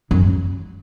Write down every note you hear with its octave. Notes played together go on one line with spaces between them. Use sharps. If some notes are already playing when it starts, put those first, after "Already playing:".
F#2